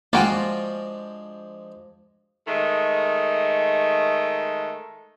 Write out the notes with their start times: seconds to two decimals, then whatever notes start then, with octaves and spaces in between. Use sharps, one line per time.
0.13 F3 G#3 A#3 D4 F4 F#4 G5 G#5
2.48 D#3 G#3 A3